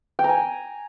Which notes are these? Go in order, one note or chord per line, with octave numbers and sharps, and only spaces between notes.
G5
A#5
G#5